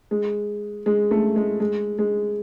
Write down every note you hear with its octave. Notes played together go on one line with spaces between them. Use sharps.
G#3
G#3
A3
G#3
G#3
G#3